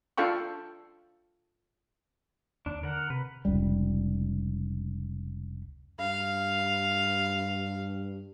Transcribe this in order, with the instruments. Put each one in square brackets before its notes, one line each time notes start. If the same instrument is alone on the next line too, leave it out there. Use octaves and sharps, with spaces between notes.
[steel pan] D4 F4 A4 F5 G5 C#6
[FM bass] D#2 [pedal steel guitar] D4
[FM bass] D3 [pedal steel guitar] A#4 F#5
[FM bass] C3 [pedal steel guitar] B4
[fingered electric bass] F1 C#2 G3
[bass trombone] G2 [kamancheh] F5